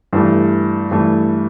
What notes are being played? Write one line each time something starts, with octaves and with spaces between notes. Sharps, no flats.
G2 E3 A3
G2 E3 A3